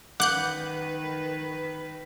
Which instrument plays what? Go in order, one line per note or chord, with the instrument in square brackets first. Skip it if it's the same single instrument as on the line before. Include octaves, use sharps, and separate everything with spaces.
[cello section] D#3 B4 [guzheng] F#5 [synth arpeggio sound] D6 F#6 G6